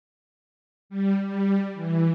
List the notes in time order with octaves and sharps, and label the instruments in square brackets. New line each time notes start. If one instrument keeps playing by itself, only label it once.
[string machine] G3
G3
E3